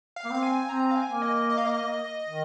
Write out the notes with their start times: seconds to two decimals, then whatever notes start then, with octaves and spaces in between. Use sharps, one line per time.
0.16 F5
0.24 A#3
0.30 C4 F5
0.43 G#5
0.69 C4 A#5
0.91 F5
0.96 G#5
1.09 A#3
1.22 D#5
1.50 D#5
1.58 F5
1.66 D#5
2.28 D#3